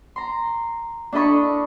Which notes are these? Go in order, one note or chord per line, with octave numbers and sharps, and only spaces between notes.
A#5 C6
D4 E4 A4 D#5 B5 C#6